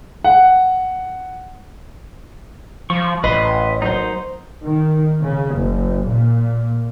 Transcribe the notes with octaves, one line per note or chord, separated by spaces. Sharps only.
F#5
F3 C#6
A1 B4 D#5 B5 C6
F#3 A#3 D#4 C5
D#3
C#3
F#1
A#2